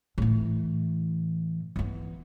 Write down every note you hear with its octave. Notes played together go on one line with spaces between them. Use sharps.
A2 E3
E3 B3